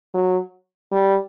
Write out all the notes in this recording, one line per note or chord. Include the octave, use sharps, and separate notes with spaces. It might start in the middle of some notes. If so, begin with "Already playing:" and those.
F#3
G3